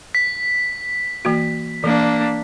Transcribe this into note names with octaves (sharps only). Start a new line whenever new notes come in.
B6
E3 A#3 F#4
E3 A#3 D4